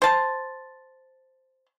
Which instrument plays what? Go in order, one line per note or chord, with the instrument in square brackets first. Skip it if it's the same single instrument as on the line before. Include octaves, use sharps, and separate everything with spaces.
[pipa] C5 A5